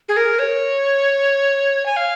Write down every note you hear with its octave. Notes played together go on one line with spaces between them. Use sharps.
G#4
A#4
C#5
G#5
F5